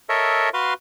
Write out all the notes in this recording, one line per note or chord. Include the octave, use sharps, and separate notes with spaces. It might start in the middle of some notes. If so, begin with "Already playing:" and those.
A4 A#4 C#5 D#5 E5
F#4 B4 F5 C6